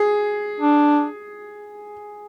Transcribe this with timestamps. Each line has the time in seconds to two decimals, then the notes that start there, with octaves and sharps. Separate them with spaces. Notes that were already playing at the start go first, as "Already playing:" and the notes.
Already playing: G#4
0.60 D4